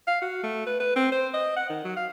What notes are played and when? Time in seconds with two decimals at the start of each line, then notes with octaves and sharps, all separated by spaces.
0.08 F5
0.22 F#4
0.43 A3
0.67 B4
0.80 B4
0.96 C4
1.12 C5
1.34 D#5
1.57 F#5
1.70 D#3
1.85 F#3
1.97 F5